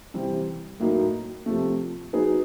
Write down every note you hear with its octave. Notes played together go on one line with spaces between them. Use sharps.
C3 E3 G3 C4
A2 F#3 A#3 D#4
C3 F3 A3
F#3 B3 D#4 G#4